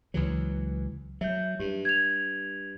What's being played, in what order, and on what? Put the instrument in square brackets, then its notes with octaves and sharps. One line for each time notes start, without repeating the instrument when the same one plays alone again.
[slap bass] C#2 E3 F#3
[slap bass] F#3 [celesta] E5 G6
[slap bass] G2 [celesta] G4
[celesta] G#6 F7